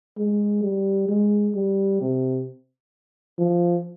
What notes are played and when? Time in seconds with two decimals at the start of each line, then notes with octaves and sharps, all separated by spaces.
0.18 G#3
0.63 G3
1.09 G#3
1.55 G3
2.01 C3
3.38 F3